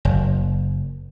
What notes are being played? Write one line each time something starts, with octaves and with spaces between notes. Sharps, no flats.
F#1